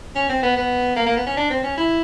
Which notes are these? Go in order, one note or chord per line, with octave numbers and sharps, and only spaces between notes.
C#4
C4
B3
B3
A#3
A#3
B3
C#4
D4
C4
C#4
E4